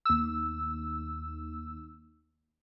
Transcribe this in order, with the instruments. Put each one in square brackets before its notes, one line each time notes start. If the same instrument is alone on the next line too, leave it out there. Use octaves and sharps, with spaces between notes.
[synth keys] D#2 E6